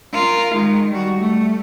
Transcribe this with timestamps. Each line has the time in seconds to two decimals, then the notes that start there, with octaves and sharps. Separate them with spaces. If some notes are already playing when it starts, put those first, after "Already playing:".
0.14 F4 A#4
0.54 D#3 G#3
0.90 G3 F#4
1.19 G3 A3